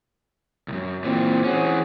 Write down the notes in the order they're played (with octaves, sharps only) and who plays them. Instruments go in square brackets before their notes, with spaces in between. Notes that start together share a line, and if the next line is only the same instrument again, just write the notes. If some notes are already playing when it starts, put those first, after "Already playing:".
[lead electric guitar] C2 F#2
[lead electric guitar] A#2 E3 [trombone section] C4
[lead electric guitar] E3 C#4 [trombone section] C4 F#4 G#4